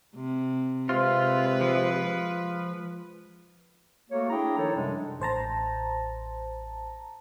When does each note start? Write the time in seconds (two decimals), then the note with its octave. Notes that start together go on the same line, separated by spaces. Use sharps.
0.15 C3
0.89 C3 G#3 F4 B4
1.61 F3
4.11 A3 A#3 F#4 A4 C#5
4.30 D4 E4 G#4 G5 A#5
4.58 D#3 F3 D#4 A4 C#5
4.76 F#2 C3 G3 G#3 D4
5.20 A1 C5 A5 A#5